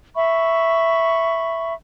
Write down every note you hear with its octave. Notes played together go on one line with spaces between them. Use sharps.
E5 B5 C#6